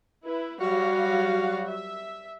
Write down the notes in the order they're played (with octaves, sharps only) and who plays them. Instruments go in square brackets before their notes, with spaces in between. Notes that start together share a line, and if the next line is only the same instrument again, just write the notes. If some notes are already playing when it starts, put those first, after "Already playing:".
[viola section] E4 B4
[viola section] F#3 G3 F5 [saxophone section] F#4
[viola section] E5